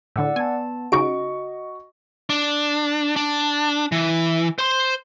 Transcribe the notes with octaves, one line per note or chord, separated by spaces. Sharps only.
A2 D3 D5 F#5 E6
B3 G#5 A5
C#3 D#4 F#4 D#5 C#6 D7
D4
D4
E3
C5 C6